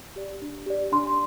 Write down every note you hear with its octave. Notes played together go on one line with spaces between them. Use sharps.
G4 D5
D4
G4 D5
D4 C6